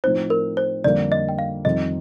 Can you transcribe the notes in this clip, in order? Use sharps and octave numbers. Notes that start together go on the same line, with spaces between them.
A2 F3 C4 D#4 C5
A#4
C5
F2 D3 G3 A#3 D5
D#5
G5
F5
F2 D#3 G3 C4 D#4 D#5